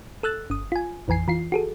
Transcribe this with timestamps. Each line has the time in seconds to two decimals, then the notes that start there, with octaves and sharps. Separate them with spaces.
0.23 A4 E6 F#6 A6
0.50 G1 D#6
0.72 F4 G#5
1.08 A1 F2 E3 G#5 C7
1.28 E3 F4 C7
1.52 F#4 G#4 A4